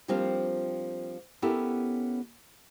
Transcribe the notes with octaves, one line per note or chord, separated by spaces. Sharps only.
F3 G3 A#3 C4 D4 F4
B3 C#4 E4 G4 A4 A#4